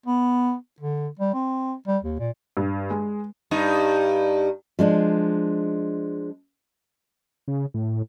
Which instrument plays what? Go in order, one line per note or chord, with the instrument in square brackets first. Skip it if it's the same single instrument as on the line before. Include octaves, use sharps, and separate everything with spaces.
[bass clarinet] B3
D3
G3
C4
G3
D#2
A#2
[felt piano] G2
G#3
[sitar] G2 D#4
[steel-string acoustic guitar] F3 G#3 D4
[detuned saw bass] C#3
A2